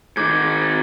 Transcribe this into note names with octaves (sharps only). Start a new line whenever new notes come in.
G#2 D#3 D6 G6 G#6